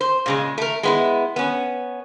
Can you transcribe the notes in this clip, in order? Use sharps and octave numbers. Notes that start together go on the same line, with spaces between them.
C5
A#2 C#3 G#3
A3 A#4
G#3 B3 E4
B3 C#4